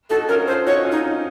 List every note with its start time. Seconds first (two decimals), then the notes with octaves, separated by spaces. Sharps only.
0.10 D#4 F#4 A4
0.28 C#4 F4 A#4
0.47 F4 A4 C5
0.67 D#4 F#4 C#5
0.85 C#4 F4
0.92 D#4
1.04 C4 D#4